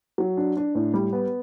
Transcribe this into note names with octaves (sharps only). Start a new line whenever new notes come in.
F#3
D4
D4
A2
G3
B3